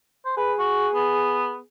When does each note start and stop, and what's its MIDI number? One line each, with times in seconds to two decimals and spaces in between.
0.25 0.35 72
0.37 1.62 68
0.37 0.53 71
0.59 0.88 66
0.94 1.58 59